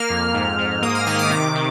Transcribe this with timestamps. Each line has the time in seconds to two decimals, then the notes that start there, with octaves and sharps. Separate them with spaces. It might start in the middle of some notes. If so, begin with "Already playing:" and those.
Already playing: A#3 F6
0.10 F2
0.34 G#2
0.58 G#2
0.82 A#3 D#6
0.95 F6
1.07 D#3 D#6
1.19 D6
1.30 C3 D6
1.55 C3